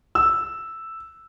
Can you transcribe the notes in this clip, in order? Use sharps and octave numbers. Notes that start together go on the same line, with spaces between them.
E6